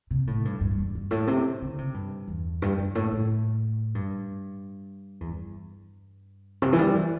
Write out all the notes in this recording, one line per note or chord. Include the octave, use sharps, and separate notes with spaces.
C3
A2
G2
G2
G2
E2
G2
A2
C3
D3
C3
G2
E2
G2
G2
A2
A2
G2
E2
G2
C3
E3
G3
E3